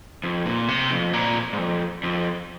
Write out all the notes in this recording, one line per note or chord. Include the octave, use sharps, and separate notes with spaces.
F2
A#2
C3
F2
A#2
G#2
F2
F2